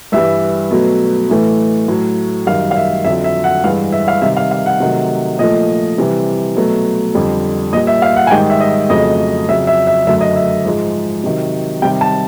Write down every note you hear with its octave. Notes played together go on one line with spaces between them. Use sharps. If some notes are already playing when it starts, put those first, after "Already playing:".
G2 E3 G3 E5
B2 F#3 A3
A2 E3 A3
A2 F#3 A3
F#2 D#3 G3 F5
F5
E5
F2 D3 F#3 E5
E5
F#5
G2 E3 G#3 F5
E5
F5
C3 D#3 G3 E5
F5
F5
F#5
C3 D#3 F#3 A3
A#2 F3 A3 D#5
C3 E3 G3
B2 F#3 A3
F2 D3 G3
A#2 G3 D#5
E5
F5
F#5
G#5
G#2 D#3 G3 G5
E5
D#5
F2 C#3 F#3 A3 D#5
F2 C#3 F#3 E5
E5
E5
F#2 D3 F#3 A3 E5
D#5
E5
G#2 F3 G#3
C3 D#3 F#3
C3 D#3 G3 G5
A5